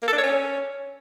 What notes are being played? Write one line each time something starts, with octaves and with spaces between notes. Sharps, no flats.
A#3
A4
D4
C#5
C#4